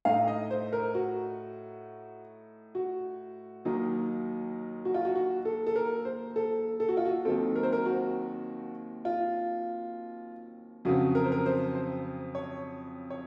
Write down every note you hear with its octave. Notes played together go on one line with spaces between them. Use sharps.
A2 A3 D#4 F5
D#5
C5
A#4
F#4
F#4
D#2 D#3 F#3 A#3 D#4
F#4
F4
F#4
F#4
A4
A4
A#4
C5
A4
A4
F#4
F4
F#4
D#2 D#3 F#3 C4 A4
A#4
C5
A#4
F#4
F4
F2 C#3 F#3 C4 F#4
A#4
C5
A#4
C5
C5
C#5
C#5